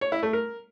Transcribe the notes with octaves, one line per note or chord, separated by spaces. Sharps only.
C#5
E4
A3
A#4